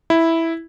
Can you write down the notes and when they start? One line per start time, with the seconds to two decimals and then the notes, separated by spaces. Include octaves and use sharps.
0.10 E4